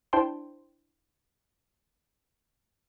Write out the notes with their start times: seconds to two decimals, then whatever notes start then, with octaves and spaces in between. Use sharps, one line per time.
0.13 D4 E4 C5 G5 A5 C6